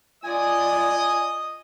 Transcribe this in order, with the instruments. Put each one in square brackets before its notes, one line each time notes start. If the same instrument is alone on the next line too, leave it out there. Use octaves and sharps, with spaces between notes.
[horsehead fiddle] F4 D5 [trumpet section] D#5 D#6 [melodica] G#5